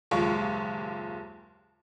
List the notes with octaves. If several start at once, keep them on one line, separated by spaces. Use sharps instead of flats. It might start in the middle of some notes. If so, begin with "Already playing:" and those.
F#1 D#2 A#2 G#3 F4 C#6